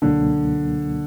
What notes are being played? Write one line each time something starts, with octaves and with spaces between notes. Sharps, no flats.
C#2 B2 D3 F#3 A#3 D4